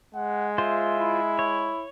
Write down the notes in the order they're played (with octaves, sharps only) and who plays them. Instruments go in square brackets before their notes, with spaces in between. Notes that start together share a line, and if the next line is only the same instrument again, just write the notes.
[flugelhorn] G#3 [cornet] F#5
[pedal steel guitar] F4 C5 [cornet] E5
[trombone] E4
[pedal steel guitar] C#5